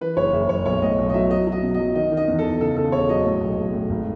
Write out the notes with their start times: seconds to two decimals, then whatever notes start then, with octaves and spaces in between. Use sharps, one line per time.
0.01 E3 B4
0.17 F#1 C#5
0.33 F#1 E5
0.49 F#1 C#5
0.66 B1 C#5
0.82 A2 D#5
0.99 B1
1.09 D#5
1.14 F#3 E5
1.30 F#3 D#5
1.47 F#3 D#5
1.63 B2
1.74 D#5
1.79 F#3
1.95 D#3 D#5
2.12 D#3
2.17 D#5
2.28 E2
2.39 A4
2.44 E2
2.60 C#3 A4
2.77 C#3 A4
2.92 E1 C#5
3.09 F#3 D#5
3.25 A2
3.41 B1
3.58 B1
3.74 A2
3.90 G#1